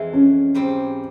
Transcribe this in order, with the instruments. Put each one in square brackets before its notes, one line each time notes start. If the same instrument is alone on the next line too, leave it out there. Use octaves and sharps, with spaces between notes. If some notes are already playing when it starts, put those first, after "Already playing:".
Already playing: [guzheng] F2 E3 G#3 C4
[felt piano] C#4
[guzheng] G#2 G3 C4